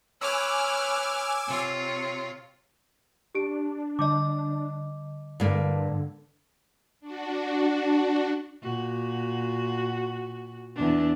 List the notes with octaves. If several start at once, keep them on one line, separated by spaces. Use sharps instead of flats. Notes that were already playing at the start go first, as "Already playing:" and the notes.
B4 C#5 G#5 D6 E6 F6
C3 F4 C#5
D4 G4 D7
D3 G3 D#5 D6
G2 D3 A#3
D4 F#4
A#2 F#4
E2 D4